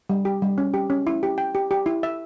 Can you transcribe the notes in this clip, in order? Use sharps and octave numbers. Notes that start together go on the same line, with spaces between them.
G3
G4
G3
C#4
G4
C#4
E4
G4
G5
G4
G4
E4
E5